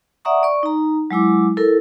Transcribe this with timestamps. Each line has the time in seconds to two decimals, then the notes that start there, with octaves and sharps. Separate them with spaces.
0.25 D5 E5 F#5 A#5 C#6 D#6
0.43 D5 C#6
0.63 D#4 A#5
1.11 F#3 G#3 E4 D6
1.57 E4 A4 A#4